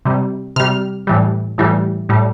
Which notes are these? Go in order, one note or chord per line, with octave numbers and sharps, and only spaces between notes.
C3 G3
C3 G3 F6
A2 E3 G3
A2 E3 G3
A2 G3